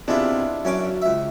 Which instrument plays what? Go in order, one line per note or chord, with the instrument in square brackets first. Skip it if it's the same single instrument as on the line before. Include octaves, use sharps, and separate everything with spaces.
[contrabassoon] C3 [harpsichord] G#3 B3 [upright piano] D4 E4 F4
[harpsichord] F#2 C#4 D6 [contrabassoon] F#3
[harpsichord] C#2 E5